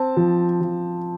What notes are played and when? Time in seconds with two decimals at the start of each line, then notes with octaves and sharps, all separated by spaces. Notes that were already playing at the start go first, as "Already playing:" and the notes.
Already playing: C4 A5
0.17 F3
0.61 F3